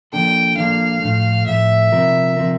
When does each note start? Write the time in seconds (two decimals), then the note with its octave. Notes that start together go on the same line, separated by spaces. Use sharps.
0.13 F3 A#3 D4 A4 G5
0.57 F3 A#3 D4 A4 F5
1.02 A2 F3 A3
1.47 A2 F3 A3 E5
1.92 C3 F3 C4 F4 A#4
2.37 C3 F3 C4 F4 A#4